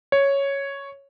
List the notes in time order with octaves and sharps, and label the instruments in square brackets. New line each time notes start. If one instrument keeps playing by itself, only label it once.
[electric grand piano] C#5